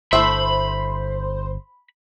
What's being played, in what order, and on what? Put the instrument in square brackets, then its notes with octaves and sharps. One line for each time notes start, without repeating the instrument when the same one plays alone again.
[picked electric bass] G1 [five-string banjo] A3 E4 E5 [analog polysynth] C5 [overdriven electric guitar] B5